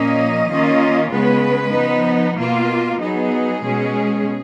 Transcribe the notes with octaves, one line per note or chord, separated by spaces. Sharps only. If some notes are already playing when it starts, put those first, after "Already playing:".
Already playing: A#2 F3 A#3 C#4 D#5
D#3 A#3 C#4 F4
C#3 G#3 B3 B4
F3 B3 D#4
B2 A#3 F4
F#3 B3 D#4 G#4
B2 G#3 C#4